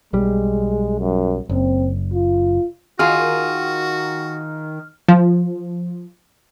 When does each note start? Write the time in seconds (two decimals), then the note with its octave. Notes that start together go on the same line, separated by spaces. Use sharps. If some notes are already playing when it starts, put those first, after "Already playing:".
0.13 B1 G3 G#3
1.00 F#2
1.49 F#1 C4
2.14 F4
2.99 D#3 F4 F#4 G#4 F6
5.08 F3